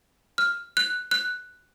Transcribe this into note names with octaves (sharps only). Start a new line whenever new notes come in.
F6
F#6
F#6